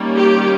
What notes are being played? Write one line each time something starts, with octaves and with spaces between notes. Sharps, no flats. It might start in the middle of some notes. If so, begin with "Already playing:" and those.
Already playing: D#3 G3 A#3 C#4
G4